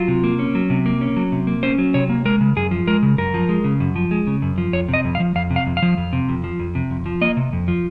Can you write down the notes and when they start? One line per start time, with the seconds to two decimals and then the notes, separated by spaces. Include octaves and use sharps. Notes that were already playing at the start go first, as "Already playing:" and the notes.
Already playing: F#3 F4
0.08 C3
0.24 A#3
0.39 C#4
0.55 F#3
0.70 C3
0.86 A#3
1.01 C#4
1.16 F#3
1.32 C3
1.47 A#3
1.63 C#4 C5
1.78 F#3
1.94 C3 C#5
2.09 A#3
2.25 G#3 A#4
2.41 C#3
2.56 F#2 G#4
2.71 F3
2.87 G#3 A#4
3.03 C#3
3.18 F#2 A#4
3.34 F3
3.49 G#3
3.64 C#3
3.80 F#2
3.96 F3
4.11 G#3
4.27 C#3
4.42 F#2
4.58 F3
4.73 F2 C#5
4.88 C3
4.94 D#5
5.05 F2
5.15 F5
5.20 F3
5.35 F2 F5
5.51 C3
5.56 F5
5.66 F2
5.77 F5
5.82 F3
5.97 F2
6.13 C3
6.29 F2
6.44 F3
6.60 F2
6.75 C3
6.91 F2
7.06 F3
7.21 A#3 D#5
7.37 C3
7.53 F2
7.68 F3